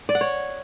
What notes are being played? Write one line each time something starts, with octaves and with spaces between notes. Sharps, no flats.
D5
F#5
C#5